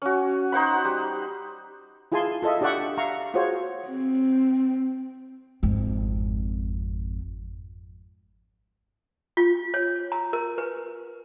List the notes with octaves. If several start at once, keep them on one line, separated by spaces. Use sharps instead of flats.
C#4 F#4
D#4 C5 F#5 B5
G3
E4 F4 G#4 G#5 A5 C6
F4 A4 D#5 E5
D4 G4 D5 E5 F#5 C#6
E5 F5 A#5 C#6
F4 F#4 G#4 C5 C#5
C4
G#1 F2
F4
C#5
A#5
A#4
B4